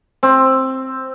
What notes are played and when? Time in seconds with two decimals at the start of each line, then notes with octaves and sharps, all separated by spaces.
0.23 C4